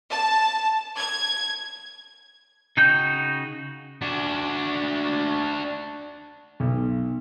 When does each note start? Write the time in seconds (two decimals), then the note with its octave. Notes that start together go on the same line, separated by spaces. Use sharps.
0.11 A5
0.98 G#6
2.77 C#3 D#4 F#4 G5 G6
4.02 D4 F#4
6.60 B1